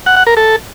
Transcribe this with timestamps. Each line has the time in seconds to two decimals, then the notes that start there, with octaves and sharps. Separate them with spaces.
0.06 F#5
0.17 F#5
0.27 A#4
0.37 A4